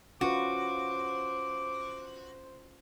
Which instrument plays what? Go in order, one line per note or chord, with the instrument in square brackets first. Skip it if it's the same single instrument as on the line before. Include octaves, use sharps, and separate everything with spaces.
[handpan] C#4 F4 B4 [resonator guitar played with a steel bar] F#4 [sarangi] C5 [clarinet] D6